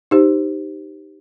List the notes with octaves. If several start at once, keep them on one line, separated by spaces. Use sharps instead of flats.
D#4 G4 C5